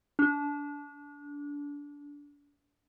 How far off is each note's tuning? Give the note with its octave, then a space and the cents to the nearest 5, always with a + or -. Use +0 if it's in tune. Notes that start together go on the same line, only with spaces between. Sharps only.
D4 -25